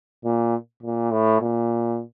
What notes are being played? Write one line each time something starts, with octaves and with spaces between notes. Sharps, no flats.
A#2
A#2
A2
A#2